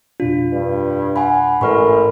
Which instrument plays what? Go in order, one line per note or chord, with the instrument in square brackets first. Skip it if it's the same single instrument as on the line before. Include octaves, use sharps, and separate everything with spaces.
[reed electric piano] F2 B2 D4 [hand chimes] F4
[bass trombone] G2
[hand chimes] F#5 G#5 B5
[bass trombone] A1 [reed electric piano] G#2 C#6 F6 [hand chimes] A4 A#4 B5